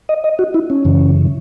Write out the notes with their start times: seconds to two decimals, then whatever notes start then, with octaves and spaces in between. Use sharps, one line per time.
0.09 D#5
0.24 D#5
0.39 F#4
0.54 E4
0.70 C#4
0.85 F#2 C#3 E3